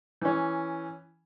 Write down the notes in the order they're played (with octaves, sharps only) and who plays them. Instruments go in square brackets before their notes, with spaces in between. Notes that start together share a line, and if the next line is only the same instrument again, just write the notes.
[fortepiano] E3 C#4